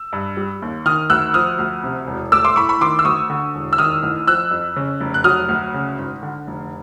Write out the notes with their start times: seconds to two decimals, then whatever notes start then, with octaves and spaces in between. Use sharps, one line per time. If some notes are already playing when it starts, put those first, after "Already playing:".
Already playing: E6
0.13 G2
0.37 G3
0.62 D#2
0.86 D#3 D#6 F6
1.10 D2 E6 F#6
1.34 F3 D#6 F6
1.59 D2
1.83 C3
2.07 E1
2.32 A3 D6 E6
2.45 C6 D6
2.56 A2 B5 C#6
2.69 B5 C#6
2.81 D#3 C6 D6
2.99 E6
3.05 D2 C#6 D#6
3.30 D3
3.55 E1
3.73 E6
3.78 D#3 D#6 F6
4.03 A1
4.28 F3 E6 F#6
4.51 F2
4.76 C#3
5.00 F1
5.14 F#6
5.24 F#3 D#6 F6
5.49 D2
5.74 C#3
5.98 G#1
6.23 D3
6.47 F1